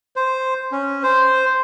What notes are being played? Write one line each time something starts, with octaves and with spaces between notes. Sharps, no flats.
C5
C#4
C5